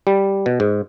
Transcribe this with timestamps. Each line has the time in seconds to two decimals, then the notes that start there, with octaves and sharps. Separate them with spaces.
0.07 G3
0.46 B2
0.60 G#2